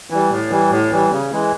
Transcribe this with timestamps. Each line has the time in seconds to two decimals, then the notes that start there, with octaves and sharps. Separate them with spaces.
0.10 E3 G3
0.31 A2
0.50 E3 G3
0.71 A2
0.91 E3 G3
1.12 C#3
1.32 E3 G#3